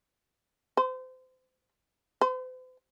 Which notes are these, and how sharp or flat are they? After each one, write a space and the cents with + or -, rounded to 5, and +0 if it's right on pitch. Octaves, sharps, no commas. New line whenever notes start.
C5 -30
C5 -45